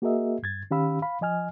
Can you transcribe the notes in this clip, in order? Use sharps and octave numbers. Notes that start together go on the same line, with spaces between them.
A#3 F#4 G#4 A#4 D#5 E5
G2 G#6 A6
D#3 C#4 G4 F5 B5 E6
F5 B5
F3 D#5 G#5 F6